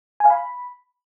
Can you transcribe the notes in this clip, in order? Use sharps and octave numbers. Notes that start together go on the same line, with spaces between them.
G#5
F5
B5